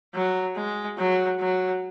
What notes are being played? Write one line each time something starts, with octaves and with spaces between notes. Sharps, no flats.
F#3
G#3
F#3
F#3